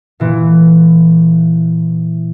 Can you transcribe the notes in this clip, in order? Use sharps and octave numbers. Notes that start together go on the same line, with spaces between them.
A#2 E3